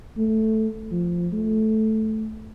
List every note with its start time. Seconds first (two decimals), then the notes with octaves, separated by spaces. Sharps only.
0.18 A3
0.91 F3
1.33 A3